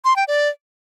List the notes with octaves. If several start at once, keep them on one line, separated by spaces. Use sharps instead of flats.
C6
G5
D5